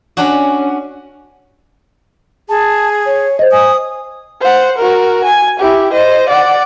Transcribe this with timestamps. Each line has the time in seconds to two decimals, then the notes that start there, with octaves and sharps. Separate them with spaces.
0.17 C#4 D4 F#4
2.49 G#4 A5
3.06 C#5
3.39 C5 D#5
3.52 G#5 D#6
4.41 C5 F#5
4.78 F#4 A#4
5.24 G#5
5.60 E4 G4
5.92 C5 D#5
6.29 D5 F#5